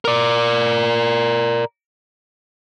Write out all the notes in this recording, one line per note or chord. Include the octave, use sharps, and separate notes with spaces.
A#4 D5